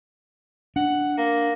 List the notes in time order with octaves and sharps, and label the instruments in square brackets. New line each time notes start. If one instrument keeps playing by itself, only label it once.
[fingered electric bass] D4 [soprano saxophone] F#5
[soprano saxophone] A#3